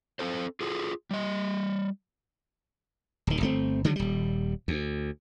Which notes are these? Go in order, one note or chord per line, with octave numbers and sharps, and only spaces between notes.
C4 A4 C5
F4 G#4 A4
G3 D#5
D1 D#3
G1 A3 C4
D3 D#3 F#3 G#3
D#1 G3
D2